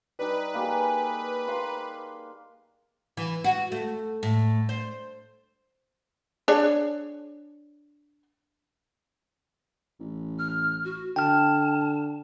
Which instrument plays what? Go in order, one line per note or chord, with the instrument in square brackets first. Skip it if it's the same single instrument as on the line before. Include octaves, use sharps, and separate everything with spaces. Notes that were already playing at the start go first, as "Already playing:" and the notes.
[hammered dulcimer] G3 D#4 [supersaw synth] B4
[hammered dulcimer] A#3 G4 G#4
A#3 C6
[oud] E3
F#4
A3
A2
C5
[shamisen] D4 G#4 C#5
[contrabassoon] A1
[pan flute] F6
F#4
[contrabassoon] D3 [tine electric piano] G5 F6 [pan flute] A5